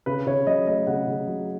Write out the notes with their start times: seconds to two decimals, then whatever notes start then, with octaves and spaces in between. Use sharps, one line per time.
0.06 C#3 B4
0.27 C#3 C#5
0.47 F#3 D#5
0.67 A3 D#5
0.87 C#3 F#5
1.07 C#3
1.28 F#3